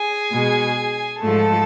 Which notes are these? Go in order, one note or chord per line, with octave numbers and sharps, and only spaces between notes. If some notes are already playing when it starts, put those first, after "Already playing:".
Already playing: G#4 G#5
B2 G#3
G#2 F3 A3 A4 A5